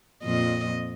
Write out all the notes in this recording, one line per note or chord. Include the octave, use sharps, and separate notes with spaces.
F2 A#2 D#5